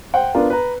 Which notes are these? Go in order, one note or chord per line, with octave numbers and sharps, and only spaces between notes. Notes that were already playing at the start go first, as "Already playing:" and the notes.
C5 F#5 G5
B3 D4 F4 A#4
B4 A#5